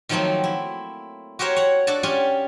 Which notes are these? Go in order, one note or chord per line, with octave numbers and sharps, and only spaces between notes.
D#3 F3 F#3 A3 A#3 C4
E4
F#4 G4 A#4 C5 C#5
C#5 F#5
D4 F#4 A4 A5
C#4 F4 G4 G#5